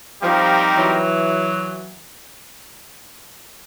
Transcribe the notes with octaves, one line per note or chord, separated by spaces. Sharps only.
F3 G3 C4 D#4 G4 A#4
E3 F#3